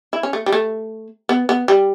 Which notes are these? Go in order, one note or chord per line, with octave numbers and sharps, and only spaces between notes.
E4
C#4
A3
G3
A3
B3
B3
G3